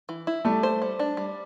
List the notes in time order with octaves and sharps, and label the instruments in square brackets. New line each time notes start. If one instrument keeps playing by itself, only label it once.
[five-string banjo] E3
E4
[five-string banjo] G3 [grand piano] A3
[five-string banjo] C5
G3
D4
G3